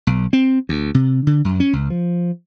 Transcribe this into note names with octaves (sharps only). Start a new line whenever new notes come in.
B1
C4
D2
C3
D3
F#2
C#4
C#2
F3